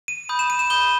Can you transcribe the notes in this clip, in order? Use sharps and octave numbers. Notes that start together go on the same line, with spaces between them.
D#7
B5 D#6 G6
E7
D#7
E7
B5 D#6 G6 G7